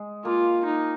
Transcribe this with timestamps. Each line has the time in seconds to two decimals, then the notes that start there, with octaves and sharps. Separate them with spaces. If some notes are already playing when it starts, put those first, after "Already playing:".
Already playing: G#3
0.25 A#3 F4
0.65 D#4